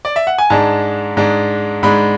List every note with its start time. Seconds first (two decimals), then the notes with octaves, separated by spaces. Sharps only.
0.05 D5
0.16 E5
0.27 F#5
0.38 G#5
0.50 G#2 G#3 D4 A5
1.17 G#2 G#3 D4
1.83 G#2 G#3 D4 B5